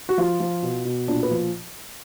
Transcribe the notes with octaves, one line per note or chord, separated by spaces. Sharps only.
F#4
F3 F4
F3
B2
B2
A#2 D4
B4
F3